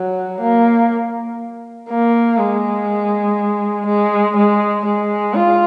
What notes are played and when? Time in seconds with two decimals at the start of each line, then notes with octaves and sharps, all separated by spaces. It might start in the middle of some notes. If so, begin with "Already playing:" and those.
Already playing: F#3
0.41 A#3
1.89 A#3
2.38 G#3
3.87 G#3
4.36 G#3
4.86 G#3
5.35 F4